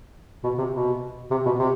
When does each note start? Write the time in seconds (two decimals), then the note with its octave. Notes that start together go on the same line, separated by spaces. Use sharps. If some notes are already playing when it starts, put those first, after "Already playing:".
0.44 B2
0.58 C3
0.73 B2
1.31 C3
1.45 B2
1.59 C3